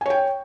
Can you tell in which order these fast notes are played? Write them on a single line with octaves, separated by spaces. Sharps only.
G#5 C#5 G5